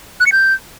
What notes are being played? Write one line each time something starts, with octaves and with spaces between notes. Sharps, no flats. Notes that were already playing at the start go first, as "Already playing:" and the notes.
F#6
C#7
G6